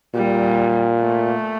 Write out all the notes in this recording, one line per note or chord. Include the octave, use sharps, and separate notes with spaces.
A#2 G3
A3